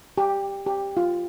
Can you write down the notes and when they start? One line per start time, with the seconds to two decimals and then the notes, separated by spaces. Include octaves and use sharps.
0.18 G4
0.66 G4
0.97 F4